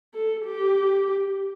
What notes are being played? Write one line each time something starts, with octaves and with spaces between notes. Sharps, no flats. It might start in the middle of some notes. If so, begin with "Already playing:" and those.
A4
G4